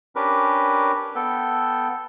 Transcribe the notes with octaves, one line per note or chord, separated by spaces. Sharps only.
C#4 D4 G4 A#4 B4
B3 A4 G5